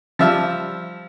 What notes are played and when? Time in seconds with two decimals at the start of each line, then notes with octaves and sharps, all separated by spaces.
0.19 F3 G3 E5 A5 F6